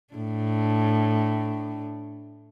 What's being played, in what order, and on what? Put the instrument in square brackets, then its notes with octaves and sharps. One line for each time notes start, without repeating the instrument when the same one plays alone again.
[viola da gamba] A2 D4